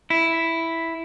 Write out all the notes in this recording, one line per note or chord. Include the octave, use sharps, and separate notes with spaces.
E4